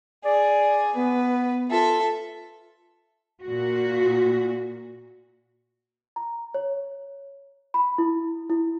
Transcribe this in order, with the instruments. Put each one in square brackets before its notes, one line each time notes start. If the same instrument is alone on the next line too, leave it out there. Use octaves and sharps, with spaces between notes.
[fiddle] G#4 [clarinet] D5
[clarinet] B3 [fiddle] B4
[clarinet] F4 [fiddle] A4 E5
[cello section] A#2 F#4
[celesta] A#5
C#5
B5
E4
E4